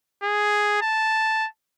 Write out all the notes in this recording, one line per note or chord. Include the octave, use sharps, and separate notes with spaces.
G#4
A5